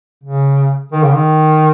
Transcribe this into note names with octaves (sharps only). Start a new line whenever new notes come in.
C#3
D#3
C#3
D#3